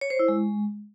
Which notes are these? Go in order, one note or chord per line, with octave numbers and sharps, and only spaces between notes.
C#5
C5
E4
G#3